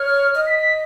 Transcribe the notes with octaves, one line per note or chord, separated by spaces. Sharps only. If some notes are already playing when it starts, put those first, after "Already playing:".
Already playing: C#5 F6
D#5
B6
B6